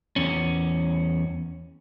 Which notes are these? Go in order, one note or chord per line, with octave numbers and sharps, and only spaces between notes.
E2 C#4